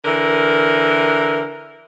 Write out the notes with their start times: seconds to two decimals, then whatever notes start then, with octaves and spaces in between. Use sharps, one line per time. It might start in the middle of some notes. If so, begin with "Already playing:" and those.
0.05 D3 E3 A#4